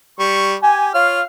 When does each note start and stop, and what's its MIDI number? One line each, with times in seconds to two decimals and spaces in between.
0.19 0.55 55
0.19 0.55 85
0.63 0.93 67
0.63 0.87 80
0.94 1.21 65
0.94 1.24 73
0.94 1.24 77
0.94 1.21 89